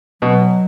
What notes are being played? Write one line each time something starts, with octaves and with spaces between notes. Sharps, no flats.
B2 F#3